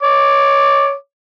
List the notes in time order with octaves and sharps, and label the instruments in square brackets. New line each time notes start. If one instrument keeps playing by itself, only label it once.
[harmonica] C#5 D6